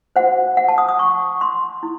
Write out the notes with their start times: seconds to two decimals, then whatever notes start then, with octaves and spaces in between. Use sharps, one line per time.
0.16 F#4 C5 F#5
0.57 F#5
0.68 A5
0.78 D#6
0.89 D#6
0.99 C#6
1.41 C6
1.83 E4